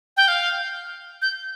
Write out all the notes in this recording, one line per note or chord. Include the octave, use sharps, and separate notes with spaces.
G5
F5
G6